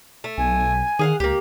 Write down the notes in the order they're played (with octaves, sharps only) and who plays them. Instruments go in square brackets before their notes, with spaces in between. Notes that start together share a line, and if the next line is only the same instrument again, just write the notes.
[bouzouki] A3
[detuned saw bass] B1 [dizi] G#5
[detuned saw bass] D#3 [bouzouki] G#4 F5 F#5
[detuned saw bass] C#2 [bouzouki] A#3 G4